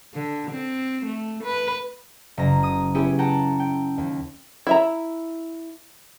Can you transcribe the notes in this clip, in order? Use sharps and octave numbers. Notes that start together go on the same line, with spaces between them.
D3
C4
A3
B4
F#1 A#5
D#6
B3 C#4 E4 G4 G#4
F#5 G5 A5 A#5
G5
D#2
E4 E5 A#5